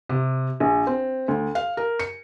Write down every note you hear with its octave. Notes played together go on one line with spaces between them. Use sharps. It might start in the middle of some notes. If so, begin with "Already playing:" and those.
C3
A#1
C4
D2
F5
A#4
C#7